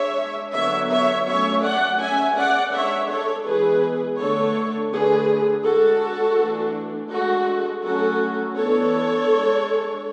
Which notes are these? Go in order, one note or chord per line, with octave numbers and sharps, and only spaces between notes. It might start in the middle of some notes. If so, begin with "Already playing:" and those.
Already playing: G#3 D4 C#5 E5
D3 F#3 B3 D4 C#5 E5
C#5 E5
F#3 A3 C#4 C#5 E5
D5 F#5
G#3 C#4 E5 G#5
D5 F#5
G#3 D4 C#5 E5
A4 C#5
E3 G#3 B3 G#4 B4
D3 A3 D4 A4 C#5
D3 A3 D4 G#4 B4
G#3 D4 F#4 A4
E3 A3 D4
G#3 D4 F#4 A4
F#3 A3 C#4 F#4 A4
E3 B3 D4 A4 C#5
G#3 D4